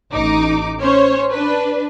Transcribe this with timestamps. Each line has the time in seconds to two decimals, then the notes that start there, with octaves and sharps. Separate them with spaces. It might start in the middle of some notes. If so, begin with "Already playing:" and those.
0.12 A1 D#4 D6
0.80 C#4 C5 C#5
1.32 D4 B4